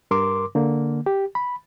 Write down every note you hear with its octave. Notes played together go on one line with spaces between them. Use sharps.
G2 A#4 C6 D6
D3 A#3
G4
B5